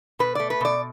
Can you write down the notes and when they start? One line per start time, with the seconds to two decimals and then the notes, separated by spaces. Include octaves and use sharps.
0.19 B2 B4
0.35 A3 D5
0.50 B4
0.61 B2 D5